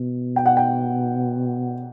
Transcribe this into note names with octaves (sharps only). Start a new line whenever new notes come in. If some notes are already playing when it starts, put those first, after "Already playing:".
Already playing: B2
G5
F#5
G5